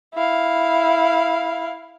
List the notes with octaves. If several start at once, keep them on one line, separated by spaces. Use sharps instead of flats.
E4 F5